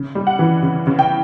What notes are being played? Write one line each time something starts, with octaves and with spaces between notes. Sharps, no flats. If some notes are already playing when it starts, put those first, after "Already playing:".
Already playing: C#3
G3
F#5
E3
C#3
C#3
G5